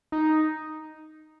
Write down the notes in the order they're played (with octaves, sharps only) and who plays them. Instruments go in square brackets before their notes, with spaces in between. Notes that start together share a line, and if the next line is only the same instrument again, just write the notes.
[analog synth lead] D#4